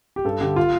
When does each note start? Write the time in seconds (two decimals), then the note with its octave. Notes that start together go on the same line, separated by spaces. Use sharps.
0.16 G4
0.25 G2 A4
0.41 D3 G4
0.56 F4